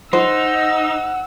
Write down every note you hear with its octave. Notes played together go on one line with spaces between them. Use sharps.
D#4 C5 F#5 E6